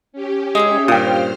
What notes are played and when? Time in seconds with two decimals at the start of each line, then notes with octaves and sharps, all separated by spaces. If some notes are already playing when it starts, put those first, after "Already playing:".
0.12 C#4 G4
0.55 G#3 D#4 G#4 E5
0.88 G2 A#2 F4 C5 G5 D#6 F6